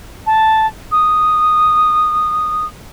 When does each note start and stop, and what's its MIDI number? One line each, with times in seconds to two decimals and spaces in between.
0.26 0.66 81
0.91 2.65 87